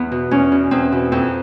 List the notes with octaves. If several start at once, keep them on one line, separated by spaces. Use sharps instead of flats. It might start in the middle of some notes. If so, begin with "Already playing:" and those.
Already playing: E2 B3
B2
E2 C#4
B2
E2 C4
B2
F2 C4